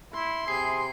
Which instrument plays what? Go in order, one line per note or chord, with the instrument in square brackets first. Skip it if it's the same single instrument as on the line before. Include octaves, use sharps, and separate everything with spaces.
[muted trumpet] E4 [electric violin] C6
[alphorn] C3 [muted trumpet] G#4 [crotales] C7